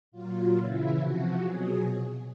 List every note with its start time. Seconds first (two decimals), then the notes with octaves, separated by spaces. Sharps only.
0.12 A#2 F#3 F4
0.53 C#3 E3 E4
0.97 C3 F3 F#4
1.39 B2 F#3 G#4